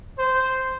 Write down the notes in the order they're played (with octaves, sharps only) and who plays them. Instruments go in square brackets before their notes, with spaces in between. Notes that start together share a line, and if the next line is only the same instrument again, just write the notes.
[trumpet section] C5